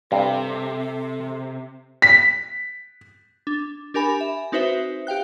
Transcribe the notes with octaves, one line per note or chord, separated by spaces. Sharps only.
G2 C3 A4
B6
D4
D4 G4 A#4 G#5 B5
E5
C4 D#4 F#4 B4 C5 E5
G4 F5 G5 F#6